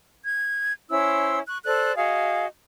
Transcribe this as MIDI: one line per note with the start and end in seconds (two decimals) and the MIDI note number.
0.24 0.72 92
0.89 1.39 61
0.89 1.39 64
0.89 1.39 72
0.89 1.39 88
1.48 1.59 85
1.48 1.59 90
1.65 1.95 69
1.65 1.95 72
1.65 1.95 74
1.65 1.95 90
1.97 2.46 66
1.97 2.46 68
1.97 2.46 75
1.97 2.46 77